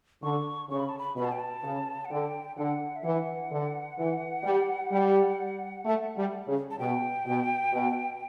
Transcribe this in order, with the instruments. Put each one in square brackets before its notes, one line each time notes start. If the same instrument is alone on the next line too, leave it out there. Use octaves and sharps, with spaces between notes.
[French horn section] D3 [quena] C#6
[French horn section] C#3 [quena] C#6
[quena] B5
A5
B5
[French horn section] B2 [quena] B5
[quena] A5
G5
A5
[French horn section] C#3
[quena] F#5
[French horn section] D3 [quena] G5
[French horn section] D3 [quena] F#5
[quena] E5
[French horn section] E3 [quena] F#5
[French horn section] D3
E3
G3
G3
A3
G3
C#3
[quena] A5
[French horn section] B2 [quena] G5
[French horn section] B2
B2